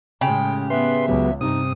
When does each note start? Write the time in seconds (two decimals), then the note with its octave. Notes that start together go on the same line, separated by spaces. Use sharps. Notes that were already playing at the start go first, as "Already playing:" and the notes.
0.21 A2 C#3 G#3 G4 G5
0.70 B3 B4 E5 C6
1.08 C#2 F#3 B3
1.41 G2 C3 D#4 D#6